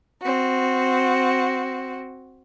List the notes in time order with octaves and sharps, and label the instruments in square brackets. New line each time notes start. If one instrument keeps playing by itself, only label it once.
[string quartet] C4 F#4